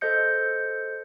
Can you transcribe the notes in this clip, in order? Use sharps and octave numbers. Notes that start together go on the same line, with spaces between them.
A4 C5 D#5 G6 C#7